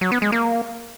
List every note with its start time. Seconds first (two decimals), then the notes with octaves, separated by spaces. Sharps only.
0.01 F#3
0.12 B3
0.22 G#3
0.32 A#3